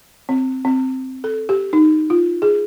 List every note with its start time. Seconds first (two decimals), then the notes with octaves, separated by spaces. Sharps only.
0.29 C4
0.65 C4
1.24 A4
1.49 G4
1.73 D#4
2.10 F4
2.42 G#4